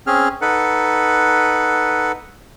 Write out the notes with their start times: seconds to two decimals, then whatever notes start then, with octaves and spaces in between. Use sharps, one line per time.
0.07 C4 C#4 G#4 F6
0.41 D#4 A4 B4 F#5